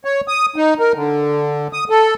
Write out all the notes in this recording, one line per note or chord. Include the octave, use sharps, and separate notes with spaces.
C#5
D#6
D#4
A#4
D3
D#6
A4